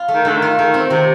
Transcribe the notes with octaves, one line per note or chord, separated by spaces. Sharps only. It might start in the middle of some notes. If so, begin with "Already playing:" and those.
Already playing: F4
A3
D#3
D3 A3
D#3
F4
D#3 A3
C4
C3 D#3